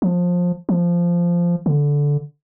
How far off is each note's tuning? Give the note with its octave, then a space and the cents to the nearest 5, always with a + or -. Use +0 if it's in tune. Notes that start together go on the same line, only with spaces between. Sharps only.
F3 +20
F3 -10
D3 -15